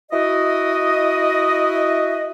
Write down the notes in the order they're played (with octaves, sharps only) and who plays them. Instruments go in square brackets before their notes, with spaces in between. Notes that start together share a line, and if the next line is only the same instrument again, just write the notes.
[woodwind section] E4 F#4 D#5